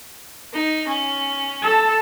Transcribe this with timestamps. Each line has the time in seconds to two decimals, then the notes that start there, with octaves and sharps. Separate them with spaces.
0.54 D#4
0.87 C#4
1.62 A4 A5